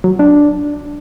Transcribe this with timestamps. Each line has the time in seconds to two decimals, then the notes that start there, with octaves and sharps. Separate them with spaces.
0.04 F#3
0.19 D4